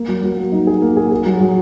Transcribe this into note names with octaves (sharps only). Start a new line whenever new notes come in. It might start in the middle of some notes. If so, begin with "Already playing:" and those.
Already playing: A#3
F#3
F#3
A#3
D#4
G#4
A#3
G#4
G#4
F#3
F#3